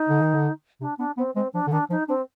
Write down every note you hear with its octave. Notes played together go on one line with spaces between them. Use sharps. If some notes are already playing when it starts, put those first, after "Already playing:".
Already playing: D#4
D3
D#3
D3
C3 D4
B3 D4
B3 C4
G#3 C4
F3 D4
D3
D#3 D4
F3 D#4
C4 D4